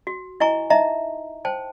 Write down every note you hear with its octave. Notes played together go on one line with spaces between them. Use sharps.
F#4
E4 D#5 G#5 A#5 C#6
D#4 D#5 E5 A#5
C5 G5 A5